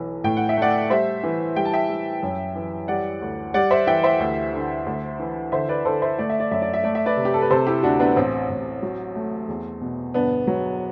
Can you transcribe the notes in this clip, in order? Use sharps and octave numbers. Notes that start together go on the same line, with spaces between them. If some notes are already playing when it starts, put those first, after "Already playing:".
Already playing: B1 E3
A2 G5
F#5
E5
A3 D5 F#5
G3 C5 E5
E3
G3 G5
A5
E5 G5
G3
F#2
E3
G3 D5 F#5
D2
G3 D5 F#5
C5 E5
E3 E5 G5
C5 E5
D2
D3
D2
E3
D3 C5 E5
B4 D5
D3 A4 C5
C5 E5
A3 D5
E5
D5
F#2 E5
D5
E5
A3 D5
E5
B4 D5
C3
G4
A4
B4
C3 A4 C5
E4 G4
D2 D4 F#4
B3 D4
A1 C4
A1
F#3
A3
E2
B2
G1 B3 D4
F#3